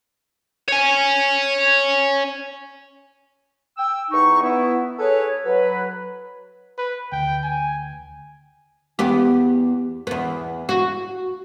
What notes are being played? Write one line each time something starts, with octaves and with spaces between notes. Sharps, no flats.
C#5 G#5
G5 E6
E2 D#4 C#6
B3 E4
G#4 A4 B4 C#5
F#3 B4
B4
D2 G5
G#5
E2 B3 G4
E2 B3
F#4